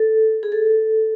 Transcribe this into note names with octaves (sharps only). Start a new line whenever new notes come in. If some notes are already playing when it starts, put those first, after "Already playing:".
Already playing: A4
G#4
A4